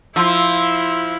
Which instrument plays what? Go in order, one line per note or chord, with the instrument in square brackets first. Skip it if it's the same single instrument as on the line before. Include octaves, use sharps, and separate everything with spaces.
[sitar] F3 [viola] E4 [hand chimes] C6 E6